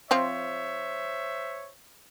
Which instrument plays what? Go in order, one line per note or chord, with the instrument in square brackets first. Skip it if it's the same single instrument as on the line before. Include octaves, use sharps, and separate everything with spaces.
[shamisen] F3 C4 F4 [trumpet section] C5 C#5 E5